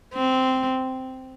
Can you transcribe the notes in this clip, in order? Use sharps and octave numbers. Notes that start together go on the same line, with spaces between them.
C4